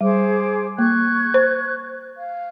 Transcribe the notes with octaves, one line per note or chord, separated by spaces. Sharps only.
G3 G#4 C5 D6
A#3 C#6 F#6 G#6
C5
F5